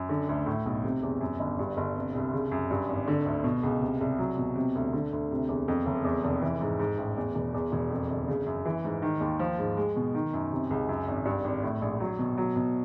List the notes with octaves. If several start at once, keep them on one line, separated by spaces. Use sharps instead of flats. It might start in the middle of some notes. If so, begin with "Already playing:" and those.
Already playing: F#2
D3
D2
A2
B1
C3
E2
F#2
G1
G2
G1
C3
C2
C#3
F#2
G2
G#1
D3
D2
B2
C#2
C3
C2
F#3
B2
C3
D2
D3
D2
C3
E2
F2
F#1
E2
F1
E3
G#2
G#2
A1
E2
E1
E2
E1
F2
G1
C#3
F#2
E3
G#2
D#3
D#2
F3
G#2
G#3
B2
D#3
F#2
C3
C#2
F#2
G#1
G2
G#1
A2
A#1
F#3
B2
F#3
B2